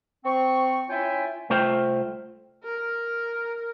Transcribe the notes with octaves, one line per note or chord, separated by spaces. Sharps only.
C4 C#6
C#4 E4 F4 E5 G5 G#5
C2 A3 F4 C5 E5 G5
A#4